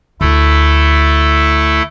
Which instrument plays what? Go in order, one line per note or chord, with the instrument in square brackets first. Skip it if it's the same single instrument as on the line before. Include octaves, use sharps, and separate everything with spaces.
[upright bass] D2 [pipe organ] A3 E4 A4